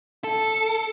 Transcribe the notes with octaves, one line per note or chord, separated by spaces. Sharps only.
A4